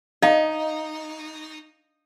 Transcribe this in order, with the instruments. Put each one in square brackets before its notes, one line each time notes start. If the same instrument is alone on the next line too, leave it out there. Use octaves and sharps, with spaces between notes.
[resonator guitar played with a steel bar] D#4 [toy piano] D#5 F5